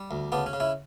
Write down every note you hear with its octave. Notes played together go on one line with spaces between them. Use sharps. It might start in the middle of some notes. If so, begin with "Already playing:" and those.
Already playing: G3
D2
C#3 B3 D4
C#4
C#3
C#4 E4